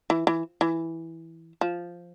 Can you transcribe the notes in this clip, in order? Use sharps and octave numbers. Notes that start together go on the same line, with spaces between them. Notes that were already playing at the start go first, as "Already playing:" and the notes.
E3
E3
E3
F3